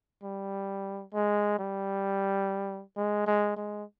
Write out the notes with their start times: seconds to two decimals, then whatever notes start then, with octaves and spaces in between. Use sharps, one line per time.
0.23 G3
1.13 G#3
1.59 G3
2.97 G#3
3.27 G#3
3.56 G#3